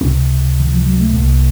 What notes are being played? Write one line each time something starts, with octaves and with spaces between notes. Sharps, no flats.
C#2 C3 C4
D#3
F3
F#3
A3
C2 C3 A#3